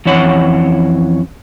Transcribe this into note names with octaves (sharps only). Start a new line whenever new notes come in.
F2 E3 C#4 C#5 F#5